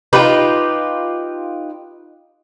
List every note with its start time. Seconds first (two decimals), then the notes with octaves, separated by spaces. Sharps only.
0.13 D#4 F4 G4 B4